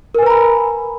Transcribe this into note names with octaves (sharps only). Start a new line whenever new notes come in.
A#4 B4 G#5 A#5 B5